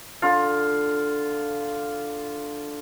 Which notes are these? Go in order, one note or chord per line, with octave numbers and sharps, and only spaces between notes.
D3 F4